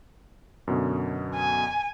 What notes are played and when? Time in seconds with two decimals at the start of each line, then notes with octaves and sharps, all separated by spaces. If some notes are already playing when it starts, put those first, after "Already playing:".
0.67 F#2 B2 D3
1.36 G#5